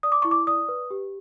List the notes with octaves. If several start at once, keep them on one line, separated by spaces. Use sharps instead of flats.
D5 D#6
D6
E4 C#6
D6
D5 D#6
B4
G4